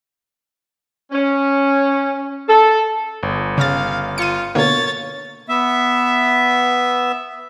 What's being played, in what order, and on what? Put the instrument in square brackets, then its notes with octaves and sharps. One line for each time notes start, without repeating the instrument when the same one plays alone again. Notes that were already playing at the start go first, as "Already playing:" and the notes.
[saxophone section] C#4
A4
[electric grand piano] G1
[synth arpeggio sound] C#3 A6 [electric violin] F5
[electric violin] F4 [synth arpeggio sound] C#7 D#7
[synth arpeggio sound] B2 D3 A#3 [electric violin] C#5 A6
[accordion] B3 E5